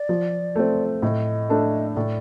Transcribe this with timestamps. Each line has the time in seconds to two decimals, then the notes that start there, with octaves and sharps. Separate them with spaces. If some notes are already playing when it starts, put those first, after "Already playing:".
Already playing: D5
0.09 F3
0.56 A3 C4
1.02 A2 D#5
1.49 A3 D4 A4
1.96 A2 D5